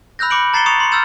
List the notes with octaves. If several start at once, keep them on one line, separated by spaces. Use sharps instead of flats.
B5 E6 F#6 G6 A#6
B5 D6 C#7 D7 F#7
A#5 A6 C7 C#7 E7 G7
C#6 D#6 A6 C#7 E7 F7
C6 C#7
E6 F6 G6 A6 E7